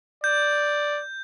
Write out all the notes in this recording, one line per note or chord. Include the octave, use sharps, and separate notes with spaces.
D5 G6